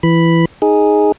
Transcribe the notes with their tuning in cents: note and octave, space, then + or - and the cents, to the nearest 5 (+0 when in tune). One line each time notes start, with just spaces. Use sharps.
E3 +15 B5 +0
D#4 +0 G#4 +0